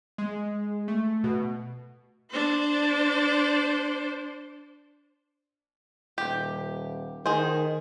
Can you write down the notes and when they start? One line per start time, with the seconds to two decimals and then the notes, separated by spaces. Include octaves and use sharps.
0.18 G#3
0.88 A3
1.24 B2
2.30 D4 C5
6.18 D#1 G4
7.26 D#3 G#4 C5